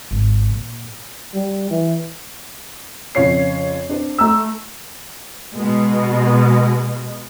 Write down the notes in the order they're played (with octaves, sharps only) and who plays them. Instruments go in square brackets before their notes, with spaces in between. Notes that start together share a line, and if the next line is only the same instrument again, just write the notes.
[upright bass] G#1
A#2
[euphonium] G3
E3
[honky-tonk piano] F2 C#3 F4 C#5 C7
C4 D4
A3 A#5 E6
[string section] B2 G#3